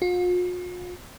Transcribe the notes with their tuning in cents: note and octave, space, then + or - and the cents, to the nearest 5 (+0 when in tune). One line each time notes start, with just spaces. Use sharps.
F4 +45